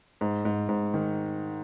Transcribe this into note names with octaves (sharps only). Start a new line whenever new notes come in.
G#2
G#2
G#2
D#3